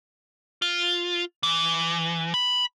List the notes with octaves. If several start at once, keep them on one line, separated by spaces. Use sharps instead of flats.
F4
E3
B5